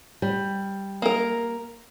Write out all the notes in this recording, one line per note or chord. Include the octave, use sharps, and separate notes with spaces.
G3
A#3 A#4